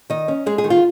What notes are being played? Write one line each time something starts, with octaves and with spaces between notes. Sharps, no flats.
D#3 D#5
C#4
G#3 G#4
G#4
D#3
F4